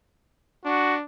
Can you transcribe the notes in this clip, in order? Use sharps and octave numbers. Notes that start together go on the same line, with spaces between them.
D4 F#4